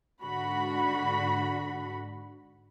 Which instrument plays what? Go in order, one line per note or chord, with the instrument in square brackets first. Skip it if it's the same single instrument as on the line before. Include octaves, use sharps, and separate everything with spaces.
[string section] G#2 D3 F#4 B5